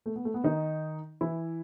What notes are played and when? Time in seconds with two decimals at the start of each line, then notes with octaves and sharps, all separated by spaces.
0.06 A3
0.16 B3
0.25 A3
0.34 B3
0.44 D#3 D#4
1.21 E3 E4